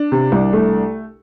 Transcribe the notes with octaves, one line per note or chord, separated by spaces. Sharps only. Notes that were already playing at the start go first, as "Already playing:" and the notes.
Already playing: D4
C3
C2
A3